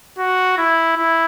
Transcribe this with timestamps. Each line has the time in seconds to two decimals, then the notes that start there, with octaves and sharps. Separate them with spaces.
0.18 F#4
0.58 E4
0.97 E4